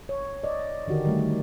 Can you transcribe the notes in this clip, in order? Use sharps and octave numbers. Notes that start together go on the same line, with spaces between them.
C#5
D5 D#5
D3 D#3 F#4 G4 A#4
D#3 G3 A3